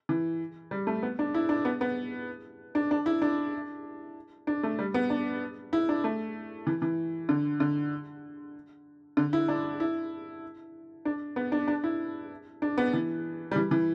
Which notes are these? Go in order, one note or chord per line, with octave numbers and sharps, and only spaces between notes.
E3
G3
A3
B3
D4
E4
D4
B3
B3
D4
D4
E4
D4
D4
A3
G3
B3
D4
E4
D4
A3
E3
E3
D3
D3
D3
E4
D4
E4
D4
B3
D4
D4
E4
D4
B3
E3
G3
E3
E3